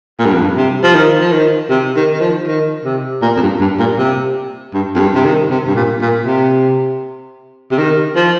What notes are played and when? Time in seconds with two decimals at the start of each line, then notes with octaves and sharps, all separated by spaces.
0.19 A#2
0.26 G2
0.33 F2
0.41 G2
0.56 C3
0.83 F3
0.95 D#3
1.21 F3
1.33 D#3
1.70 C3
1.96 D#3
2.12 D#3
2.21 F3
2.47 D#3
2.85 C3
3.22 A#2
3.36 F2
3.42 G2
3.61 G2
3.79 A#2
3.98 C3
4.74 G2
4.95 F2
4.99 G2
5.15 C3
5.25 D#3
5.50 C3
5.66 G2
5.75 A#2
6.01 A#2
6.26 C3
7.71 C3
7.78 D#3
8.15 F3